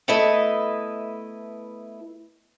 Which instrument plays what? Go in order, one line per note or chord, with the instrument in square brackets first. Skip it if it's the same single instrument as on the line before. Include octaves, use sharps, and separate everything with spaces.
[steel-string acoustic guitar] A3 B3 E4 B4 D#5